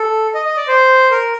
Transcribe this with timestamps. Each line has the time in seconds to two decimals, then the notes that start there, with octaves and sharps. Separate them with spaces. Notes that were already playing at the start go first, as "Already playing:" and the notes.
Already playing: A4
0.35 D#5
0.46 D#5
0.57 D5
0.68 C5
1.11 A#4